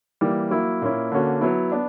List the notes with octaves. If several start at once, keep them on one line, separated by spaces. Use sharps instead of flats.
E3 G3 A#3
F#3 A#3 E4
A#2 A#3 C#4 E4
D3 A#3 C#4 F#4
F#3 B3 E4
B3 D4